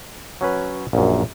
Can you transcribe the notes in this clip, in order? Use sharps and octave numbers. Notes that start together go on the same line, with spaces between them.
F#3 C#4 B4
A#1 F#2